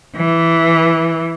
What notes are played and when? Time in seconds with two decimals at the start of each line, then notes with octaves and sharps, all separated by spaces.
0.16 E3